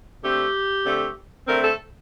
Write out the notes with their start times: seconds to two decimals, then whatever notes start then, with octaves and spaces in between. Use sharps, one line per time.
0.22 D3 A3 C4 G4
0.84 D3 A3 C4
1.46 D3 A3 C4 A#4
1.62 A4